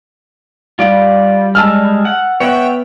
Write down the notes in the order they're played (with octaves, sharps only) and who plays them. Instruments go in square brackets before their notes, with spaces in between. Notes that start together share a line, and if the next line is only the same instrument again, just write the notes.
[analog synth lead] G3 [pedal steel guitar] F4 D5
[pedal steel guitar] G#3 [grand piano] A5 E6 F6
[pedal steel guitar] F#5
[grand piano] B3 [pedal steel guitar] C#5 E5 F#5 [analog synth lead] G5